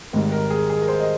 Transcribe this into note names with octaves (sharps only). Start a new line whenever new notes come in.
G#1 G#2 G3 A#4
A#4
G#4
G#4
A#4
C5
D#5